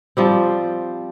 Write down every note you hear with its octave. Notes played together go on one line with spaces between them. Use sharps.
F3 G3 C4